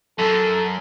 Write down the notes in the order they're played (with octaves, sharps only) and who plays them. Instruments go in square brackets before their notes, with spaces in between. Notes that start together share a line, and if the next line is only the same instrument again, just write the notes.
[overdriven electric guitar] F#2 [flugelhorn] A4